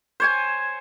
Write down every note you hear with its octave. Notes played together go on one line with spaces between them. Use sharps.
C5 C#5 G#5